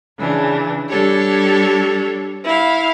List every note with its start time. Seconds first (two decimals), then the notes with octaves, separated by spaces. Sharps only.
0.17 C#3 E3 D4
0.90 G3 D4 G4 A4 C#5
2.44 E4 F5